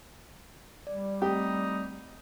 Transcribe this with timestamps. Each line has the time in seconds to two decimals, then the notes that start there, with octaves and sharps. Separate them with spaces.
0.87 G3 D5
1.22 A3 C4 D#4 G4